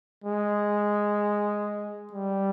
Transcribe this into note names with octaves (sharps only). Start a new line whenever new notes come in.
G#3
G3